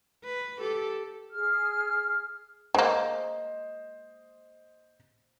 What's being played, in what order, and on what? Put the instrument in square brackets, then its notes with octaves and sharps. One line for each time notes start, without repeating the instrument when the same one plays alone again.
[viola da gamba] B4
G4 A4
[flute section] G#4 F6
[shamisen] G#3 A#3 [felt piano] C5 D#5